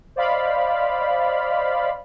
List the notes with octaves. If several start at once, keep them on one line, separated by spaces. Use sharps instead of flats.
C5 D5 D#5 F5 B5